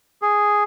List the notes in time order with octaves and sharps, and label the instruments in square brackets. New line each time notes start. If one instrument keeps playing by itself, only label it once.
[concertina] G#4